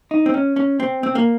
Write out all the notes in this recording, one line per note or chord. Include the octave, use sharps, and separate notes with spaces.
D#4
C4
C#4
C#4
C4
C4
A#3